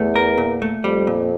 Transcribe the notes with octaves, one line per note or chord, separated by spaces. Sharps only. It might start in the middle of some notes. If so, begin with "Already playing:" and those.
Already playing: E2 A3
A#4
A#2
A3
F2 G3
A#2